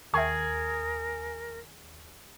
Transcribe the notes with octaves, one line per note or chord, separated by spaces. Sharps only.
D#2 G#4 A#4 E5 G5 C#6